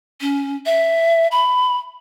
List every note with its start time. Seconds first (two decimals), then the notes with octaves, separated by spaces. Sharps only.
0.21 C#4
0.66 E5
1.31 B5